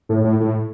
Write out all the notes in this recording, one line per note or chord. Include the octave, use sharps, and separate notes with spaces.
A2
A2
A2